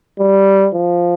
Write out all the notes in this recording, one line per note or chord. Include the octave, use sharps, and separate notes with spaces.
G3
F3